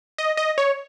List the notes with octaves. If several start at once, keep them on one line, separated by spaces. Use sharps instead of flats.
D#5
D#5
C#5